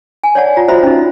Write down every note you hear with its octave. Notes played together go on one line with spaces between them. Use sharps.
G#5
C#5 D5 F#5 A5
F4 A#5
F4 F#4 C5 E5 A#5 B5
C#4 D#4